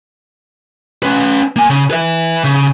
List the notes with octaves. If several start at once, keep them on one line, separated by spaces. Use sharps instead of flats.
C#4 B4
A#3 G#5
C#3
B4 E5
C#3